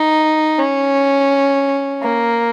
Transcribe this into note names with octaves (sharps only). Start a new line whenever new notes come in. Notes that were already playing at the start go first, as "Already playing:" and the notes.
Already playing: D#4
C#4
A#3